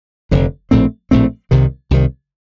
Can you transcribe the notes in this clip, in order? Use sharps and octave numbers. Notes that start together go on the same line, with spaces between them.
F1 F2 D3
A#1 A2 A3 C4
A#1 A2 A3 C4
C2 C3 D#3
C2 C3 D#3